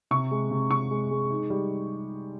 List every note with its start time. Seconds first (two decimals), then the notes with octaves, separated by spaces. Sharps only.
0.11 C3 C#6
0.31 G#3
0.51 C3
0.70 C3 C#6
0.91 G#3
1.11 G#3
1.30 D#4
1.50 G3